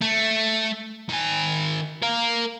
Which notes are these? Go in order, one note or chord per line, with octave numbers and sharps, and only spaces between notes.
A3
D#3 G#5
A#4 F5